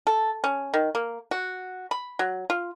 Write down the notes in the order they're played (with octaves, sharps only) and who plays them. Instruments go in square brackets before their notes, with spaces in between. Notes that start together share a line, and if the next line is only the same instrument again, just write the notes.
[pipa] A4
C#4
D#3
A#3
F#4
B5
F#3
F4